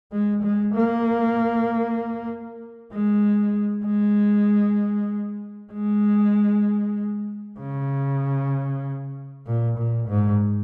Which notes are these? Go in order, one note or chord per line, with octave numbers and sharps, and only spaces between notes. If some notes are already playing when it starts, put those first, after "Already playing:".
G#3
G#3
A#3
G#3
G#3
G#3
C#3
A#2
A#2
G#2